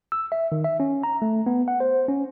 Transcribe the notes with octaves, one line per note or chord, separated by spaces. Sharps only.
E6
E5
D#3
E5
C#4
A#5
A3
B3
F#5
C5
C#4